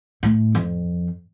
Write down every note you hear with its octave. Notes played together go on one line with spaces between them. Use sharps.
A2
F2